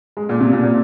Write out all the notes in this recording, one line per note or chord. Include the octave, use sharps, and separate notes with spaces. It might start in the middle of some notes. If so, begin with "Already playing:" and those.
G#3
A#2
C3
A#2
A#2